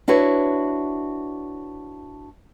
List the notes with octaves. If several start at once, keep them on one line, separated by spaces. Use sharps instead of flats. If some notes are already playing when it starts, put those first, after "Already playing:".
D4 E4 F#4 B4 C#5